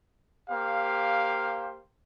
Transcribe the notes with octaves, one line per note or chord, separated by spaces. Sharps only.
A#3 G4 C5 F5